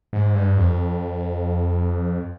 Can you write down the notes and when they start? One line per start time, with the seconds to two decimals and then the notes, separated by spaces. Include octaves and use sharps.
0.13 G#2
0.35 G2
0.58 F2